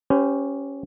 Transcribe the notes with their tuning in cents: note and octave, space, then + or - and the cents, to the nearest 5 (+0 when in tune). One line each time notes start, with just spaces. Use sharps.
C#4 +0 G4 +0 C5 -40